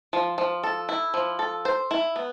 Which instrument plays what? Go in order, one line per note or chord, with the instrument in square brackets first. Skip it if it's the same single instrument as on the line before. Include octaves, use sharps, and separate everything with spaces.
[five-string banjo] F3
F3
A4
E4
F3
A4
C5
E4
B3